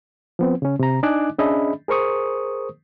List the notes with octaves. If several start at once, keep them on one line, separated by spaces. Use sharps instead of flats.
F3 B3 C4
C#3 C#4
C3 A#5
D4 D#4 D#5 G#5 D6 F#6
C#4 D4 G#4 D#5 E5 B5
G#4 A#4 C5 C#6 D#6